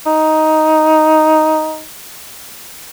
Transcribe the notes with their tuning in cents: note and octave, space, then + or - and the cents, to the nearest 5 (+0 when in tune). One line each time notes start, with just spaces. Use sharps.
D#4 +5